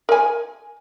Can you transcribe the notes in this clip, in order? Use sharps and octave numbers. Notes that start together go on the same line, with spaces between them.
A#4 G#5